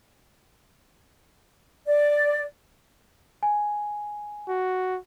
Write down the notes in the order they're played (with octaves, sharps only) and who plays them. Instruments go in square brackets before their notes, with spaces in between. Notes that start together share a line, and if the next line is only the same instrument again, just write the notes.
[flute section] D5
[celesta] G#5
[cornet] F#4